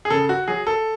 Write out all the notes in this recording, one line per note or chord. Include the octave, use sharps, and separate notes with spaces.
G#4
C#3 A4
F#4
F#3 G#4
A4